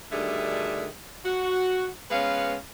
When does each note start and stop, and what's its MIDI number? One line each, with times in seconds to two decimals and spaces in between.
0.12 0.87 38
0.12 0.87 50
0.12 0.87 51
0.12 0.87 55
0.12 0.87 68
0.12 0.87 76
1.25 1.88 66
2.11 2.55 56
2.11 2.55 59
2.11 2.55 61
2.11 2.55 71
2.11 2.55 77